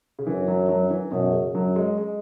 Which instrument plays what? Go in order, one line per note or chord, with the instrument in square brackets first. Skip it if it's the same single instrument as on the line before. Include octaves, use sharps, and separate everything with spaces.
[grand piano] C#3
[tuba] F#2 [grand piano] E3
[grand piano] F#3
F#3
E3
[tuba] F#2 [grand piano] B2
[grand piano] C#3
[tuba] F#2 [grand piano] F#3
[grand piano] G#3
G#3